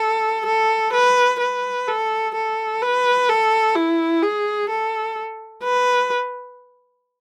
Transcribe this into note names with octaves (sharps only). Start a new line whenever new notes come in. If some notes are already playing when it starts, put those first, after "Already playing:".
Already playing: A4
A4
B4
B4
A4
A4
B4
A4
E4
G#4
A4
B4